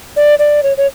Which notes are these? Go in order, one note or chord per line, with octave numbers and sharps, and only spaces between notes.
D5
D5
C#5
C#5